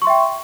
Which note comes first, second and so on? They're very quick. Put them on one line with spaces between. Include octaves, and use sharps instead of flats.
C#6 C6 E5 G5